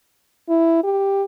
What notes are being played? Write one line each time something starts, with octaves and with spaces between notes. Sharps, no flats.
E4
G4